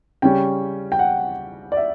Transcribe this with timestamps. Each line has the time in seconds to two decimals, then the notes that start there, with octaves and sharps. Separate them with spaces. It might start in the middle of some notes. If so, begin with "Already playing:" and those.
0.22 C#3 G3 C#4 G5
0.92 G5
0.99 F#5
1.72 D5
1.77 E5